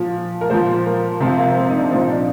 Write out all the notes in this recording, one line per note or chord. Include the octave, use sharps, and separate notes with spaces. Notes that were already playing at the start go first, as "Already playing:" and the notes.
Already playing: A#2 F3
A#4
A#2 F3 C5
A#4
C3 F3 C4
A#3
C4
D#4
D4
A#2 F3 C4
D#4
D4